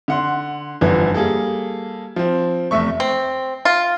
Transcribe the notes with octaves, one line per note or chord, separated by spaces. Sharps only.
D3 F#5 C6
G1 D3 E3 F3
G3 A#3 G#4 A4
F3 C4
F1 E2 A3 E5 C#6
C4
F4